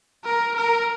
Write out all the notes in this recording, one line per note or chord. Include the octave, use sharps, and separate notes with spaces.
A#4
A#4